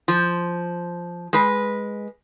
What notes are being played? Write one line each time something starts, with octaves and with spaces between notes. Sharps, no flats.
F3
G#3 B4